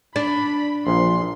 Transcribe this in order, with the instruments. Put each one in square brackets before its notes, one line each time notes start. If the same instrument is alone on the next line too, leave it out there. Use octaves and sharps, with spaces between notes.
[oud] D4 [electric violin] B5
[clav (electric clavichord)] A#1 A#2 [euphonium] F3 [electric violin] C6